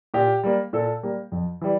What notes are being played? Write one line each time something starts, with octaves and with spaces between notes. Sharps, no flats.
A#2 G4
G3 A#3
A#2 A4
G3 A#3
F2
E3 G3